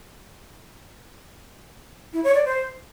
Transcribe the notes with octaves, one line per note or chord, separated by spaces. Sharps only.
E4
C#5
D5
C5